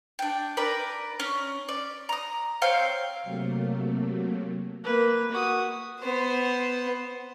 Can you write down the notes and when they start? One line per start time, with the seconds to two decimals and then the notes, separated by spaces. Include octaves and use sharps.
0.19 D4 G5
0.57 A#4 B4 D5 B5
1.20 C#4
1.69 D5
2.09 A#5 D#6
2.62 C4 C#5 F5 G5
3.23 C3 F#3 A3 A#3
4.84 A#3 B4
5.32 F#4 D#6
6.00 B3 C5